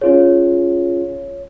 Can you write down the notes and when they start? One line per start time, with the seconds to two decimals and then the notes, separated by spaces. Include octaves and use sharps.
0.01 C#4 F4 G#4 C#5